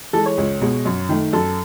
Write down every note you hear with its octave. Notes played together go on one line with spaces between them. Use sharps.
E3 G#3 A4
C#5
C#2
B2 G#3
F#2
D#3 A3
F#2 A4